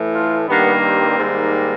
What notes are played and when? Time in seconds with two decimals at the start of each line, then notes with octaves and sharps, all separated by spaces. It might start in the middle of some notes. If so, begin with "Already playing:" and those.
Already playing: A2 E3 A3
0.13 F4
0.48 G2 D#3 G3 A#3 B3
0.83 C4
1.19 G#2 D#3 G3 A#3